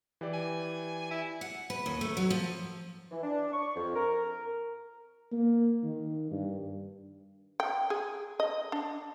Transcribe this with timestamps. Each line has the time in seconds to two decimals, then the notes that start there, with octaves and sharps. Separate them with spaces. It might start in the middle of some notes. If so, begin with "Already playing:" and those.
0.21 E3 G4 D5
0.33 G#5
1.11 E4
1.41 F#5
1.70 B4
1.86 D#2
2.01 A3
2.17 F#3
2.30 F3
3.12 E3
3.23 D4
3.53 C#6
3.76 F2
3.95 A#4
5.32 A#3
5.84 D#3
6.31 G2
7.60 G5
7.90 G#4
8.40 D#5
8.72 D4